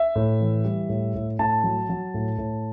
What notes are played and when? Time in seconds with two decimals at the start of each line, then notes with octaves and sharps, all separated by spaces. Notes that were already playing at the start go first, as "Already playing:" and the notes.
Already playing: E5
0.15 A2
0.40 E3
0.64 G3
0.89 A2
1.15 A2
1.39 A2 A5
1.64 F#3
1.89 F#3
2.14 A2
2.38 A2